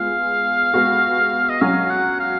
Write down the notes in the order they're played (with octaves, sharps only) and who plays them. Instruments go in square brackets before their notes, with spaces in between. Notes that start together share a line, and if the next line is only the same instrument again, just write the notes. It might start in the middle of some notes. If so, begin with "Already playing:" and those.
Already playing: [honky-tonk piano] G#3 B3 F4 [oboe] F5
[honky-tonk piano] G#3 B3 F#4
[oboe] D#5
[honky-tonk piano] F#3 C#4 F#4 [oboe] F5
[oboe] F#5
F5